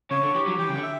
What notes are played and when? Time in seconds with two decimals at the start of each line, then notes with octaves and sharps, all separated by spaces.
0.10 C#3 C#5
0.23 D3
0.35 E3 G4
0.47 F#3
0.58 E3 G5
0.69 C#3
0.75 D3
0.83 E5